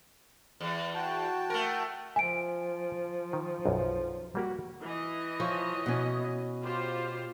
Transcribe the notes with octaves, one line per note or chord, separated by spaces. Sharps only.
E2
F#4 G5 A5
A3 A#4
F3 E5 G#5 D7
D#3
B1 F#2
G3 A#3 F#4 G4
E3 D#5
F3 C#5
B2 C#4
F4 G4 C5